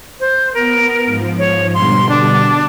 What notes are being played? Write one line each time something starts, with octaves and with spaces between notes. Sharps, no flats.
C5
B3 A#4
G#2 F3
C#5
B2 D3 G3 C6
D4